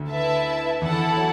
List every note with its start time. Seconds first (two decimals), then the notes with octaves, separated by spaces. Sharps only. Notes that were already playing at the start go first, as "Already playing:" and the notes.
Already playing: D2 D3
0.11 E4 B4 E5 A5
0.82 E2 E3 E4 A4 F#5 A5
1.17 F#3